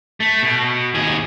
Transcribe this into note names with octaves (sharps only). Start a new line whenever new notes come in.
A3
B2
D#2 G#4